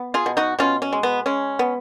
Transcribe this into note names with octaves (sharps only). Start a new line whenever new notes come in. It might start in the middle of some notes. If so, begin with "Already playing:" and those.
Already playing: B3
F4 G#4
B2
D#4 F#4
B2 C#4 F4
C#4
G#3
B3
G#3 C#4
B3